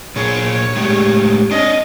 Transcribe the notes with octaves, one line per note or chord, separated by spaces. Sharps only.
A#2 G#4 C#5
A2 G#3 G4
D4 C#5 D#5